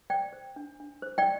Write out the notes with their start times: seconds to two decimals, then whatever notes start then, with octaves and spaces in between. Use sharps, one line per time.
0.10 C5 D5 G5
0.33 C5
0.56 D4
0.80 D4
1.02 C5
1.18 D5 G5